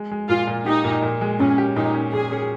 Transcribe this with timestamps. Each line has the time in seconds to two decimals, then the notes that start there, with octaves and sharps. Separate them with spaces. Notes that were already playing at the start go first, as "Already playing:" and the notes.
Already playing: G#3
0.11 G#3
0.29 A#2 F4
0.47 A#2
0.66 D#4 G4
0.84 A#2
1.02 A#2
1.21 G#3
1.39 A#2 C#4
1.58 G4
1.76 A#2 D#4
1.94 C#4
2.13 A#2 G#4
2.32 C#4